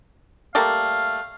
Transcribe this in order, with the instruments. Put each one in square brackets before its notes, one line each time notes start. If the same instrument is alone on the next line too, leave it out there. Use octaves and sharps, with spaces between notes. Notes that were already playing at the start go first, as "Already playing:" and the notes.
[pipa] G3 A3 A#3 [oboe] F5